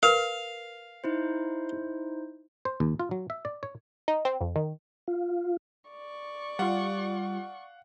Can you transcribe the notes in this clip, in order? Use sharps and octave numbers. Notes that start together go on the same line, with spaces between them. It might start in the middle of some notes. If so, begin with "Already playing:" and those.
A#4 B4 F5
D#4 E4 C5
C5
D#2
F4
F#3
E5
D5
C#5
D#4
C4
F2
D#3
F4
D5 C#6
G3 F4 F5 F#5